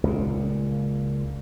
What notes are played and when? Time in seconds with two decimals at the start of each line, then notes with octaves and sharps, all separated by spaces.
0.04 C#2 A#2